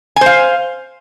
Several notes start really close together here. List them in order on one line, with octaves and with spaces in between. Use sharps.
G#5 C5 F5